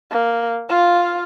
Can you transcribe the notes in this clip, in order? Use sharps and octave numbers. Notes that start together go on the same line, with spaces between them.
A#3
F4 F5